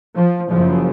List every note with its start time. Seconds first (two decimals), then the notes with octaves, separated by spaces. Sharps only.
0.16 F3
0.50 F#1 F#2 C#3 F3